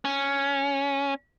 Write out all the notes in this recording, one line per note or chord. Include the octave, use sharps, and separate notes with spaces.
C#4